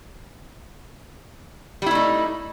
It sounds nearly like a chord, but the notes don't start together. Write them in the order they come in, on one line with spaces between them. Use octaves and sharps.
G3 E4 A3 D#4